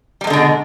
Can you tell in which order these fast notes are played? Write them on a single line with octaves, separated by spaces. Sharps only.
G3 E2 G#3 D3 B2